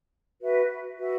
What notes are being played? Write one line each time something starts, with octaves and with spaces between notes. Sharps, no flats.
F#4 B4 E5
F#4 B4 E5